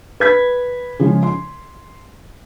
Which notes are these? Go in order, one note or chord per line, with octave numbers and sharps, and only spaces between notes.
B4 G#6 B6
C#3 F3 G#3
C6